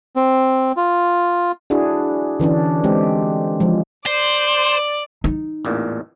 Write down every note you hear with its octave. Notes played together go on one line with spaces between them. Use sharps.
C4
F4
D4 E4 F#4 G#4
D3 E3 C#4 D4
G#3 C4 G4
F3 G#3
C5 D5
D#4
A1 E2 A#2